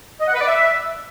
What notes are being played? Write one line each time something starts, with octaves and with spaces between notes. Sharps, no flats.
D#5
F#5
B4
D5
E5